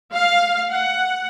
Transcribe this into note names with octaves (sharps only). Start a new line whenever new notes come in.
F5
F#5